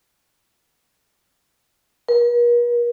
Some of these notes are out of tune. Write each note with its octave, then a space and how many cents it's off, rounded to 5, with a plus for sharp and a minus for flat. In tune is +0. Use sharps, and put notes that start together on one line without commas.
A#4 +45